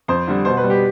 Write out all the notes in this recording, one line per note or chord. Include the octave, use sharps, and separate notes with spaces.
F2 C5
D3 G3
B2 C5
B4
G3
G4